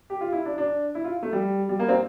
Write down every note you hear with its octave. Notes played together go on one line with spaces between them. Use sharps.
G4
F4
E4
D4
D4
E4
F4
A3
G3
G3
A#3
C4